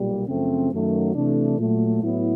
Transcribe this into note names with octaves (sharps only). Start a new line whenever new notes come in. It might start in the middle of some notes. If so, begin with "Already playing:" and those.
Already playing: B1 A#2 G3
F#2 C#3 F3 A3 C4
F#2 D#3 F#3 A3
C3 E3 A3 D4
A#2 F#3 A3
A2 F#3 B3 E4